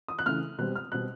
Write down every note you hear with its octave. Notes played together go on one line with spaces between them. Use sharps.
D#6
F#6
C#3 E3 A3 F6
B2 G3 C4 F#6
F6
B2 G3 C4 F#6